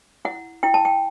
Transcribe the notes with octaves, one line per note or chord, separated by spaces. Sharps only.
E4 F#5
E4 G5
A5
G5